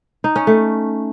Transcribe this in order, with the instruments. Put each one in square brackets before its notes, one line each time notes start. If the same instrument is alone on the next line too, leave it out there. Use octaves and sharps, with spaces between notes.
[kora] D#4
C#4
A3